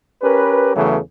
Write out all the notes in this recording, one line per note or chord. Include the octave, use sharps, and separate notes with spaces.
C#4 G4 A#4 B4
E2 C#3 E3 F#3 A3